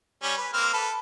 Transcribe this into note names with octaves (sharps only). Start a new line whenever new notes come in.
G3 C#4
B4
A#3 C4 F6
A4 B4